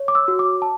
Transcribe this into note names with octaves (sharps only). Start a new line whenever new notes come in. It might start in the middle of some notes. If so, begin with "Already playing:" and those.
Already playing: C#5
D6
E6
F#4
D6
A5